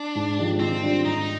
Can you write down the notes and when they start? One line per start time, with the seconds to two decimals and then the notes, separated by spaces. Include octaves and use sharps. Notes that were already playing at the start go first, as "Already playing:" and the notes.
Already playing: D4
0.15 G#2
0.38 F3 G#3 D#4 G4
0.60 D#3 C4
0.82 G3 D4 F4
1.05 G#2 D#4